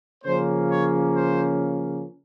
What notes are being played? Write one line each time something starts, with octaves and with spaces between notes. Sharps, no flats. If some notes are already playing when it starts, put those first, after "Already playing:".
C#3 F3 A#3 C#4 C5
C#5
C5